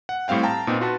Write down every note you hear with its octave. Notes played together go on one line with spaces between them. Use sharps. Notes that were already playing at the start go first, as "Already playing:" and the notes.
F#5
A2 G3 C4 F5 G5
F5 G5 A5 A#5
A#2 B3 C4 D#4
F4 F#4 B4 A5